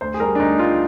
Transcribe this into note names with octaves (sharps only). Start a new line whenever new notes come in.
D2 C5
G#4
G3 A#4
D4
D2 D#4
G3 F4